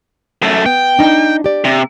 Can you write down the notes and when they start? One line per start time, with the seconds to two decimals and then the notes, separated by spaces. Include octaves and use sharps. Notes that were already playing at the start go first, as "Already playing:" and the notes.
0.42 F#2 A3
0.66 B3 G5
0.99 D4 D#4
1.44 G4 D5
1.64 C3